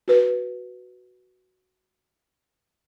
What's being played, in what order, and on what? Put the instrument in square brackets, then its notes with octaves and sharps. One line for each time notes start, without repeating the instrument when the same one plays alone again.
[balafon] F#4 B4